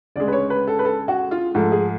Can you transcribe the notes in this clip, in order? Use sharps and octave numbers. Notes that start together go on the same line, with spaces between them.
D2 C#3 G#3 D5
B4
C#5
B4
A4
B4
A4
F#4
F4
G#2 F3 A3 A4
G#4